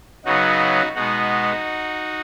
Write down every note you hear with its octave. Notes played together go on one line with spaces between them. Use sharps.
C#3 F#3 B3 D#4 F#4
B2 G#3 B3 D#4 F#4